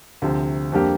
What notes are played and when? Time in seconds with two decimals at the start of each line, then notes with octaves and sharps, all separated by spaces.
0.22 D2 C3 F3
0.72 F2 D3 G3 A#3 G4